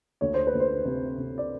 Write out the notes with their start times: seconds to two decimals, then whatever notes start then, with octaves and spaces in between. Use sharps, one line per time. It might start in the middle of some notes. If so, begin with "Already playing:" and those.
0.21 D2 C#5
0.34 C5
0.47 B4
0.53 D2
0.60 C5
0.85 C3
1.17 C3
1.38 D5